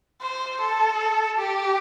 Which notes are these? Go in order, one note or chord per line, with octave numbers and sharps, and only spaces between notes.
C5
A4
G4